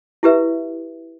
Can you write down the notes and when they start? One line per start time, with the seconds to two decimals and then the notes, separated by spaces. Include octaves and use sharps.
0.23 E4 G4 B4 E5